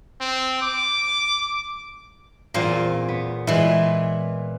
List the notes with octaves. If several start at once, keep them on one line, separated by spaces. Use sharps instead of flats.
C4
D6
E2 A#2 A#3 C4 F4 C5
B3
A#2 E3 G#3 E4